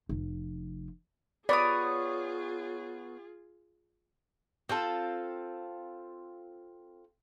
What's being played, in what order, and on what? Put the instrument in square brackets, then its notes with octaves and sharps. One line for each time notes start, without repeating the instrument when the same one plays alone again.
[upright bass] F1 F3
[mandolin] B3 C#5 D#6 [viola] F4 G#4 [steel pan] D5
[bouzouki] C4 F4 A4